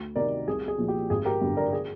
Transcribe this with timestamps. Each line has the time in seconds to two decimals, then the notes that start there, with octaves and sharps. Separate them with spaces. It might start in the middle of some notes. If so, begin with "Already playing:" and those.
Already playing: D2
0.16 C3 D#3 A#4 D5
0.47 C2 G#4
0.68 G#4
0.78 A#2 F3
0.88 G4
1.10 G#1 G#4
1.25 G4 A#4
1.41 G2 D3
1.57 A#4 D5
1.73 G#4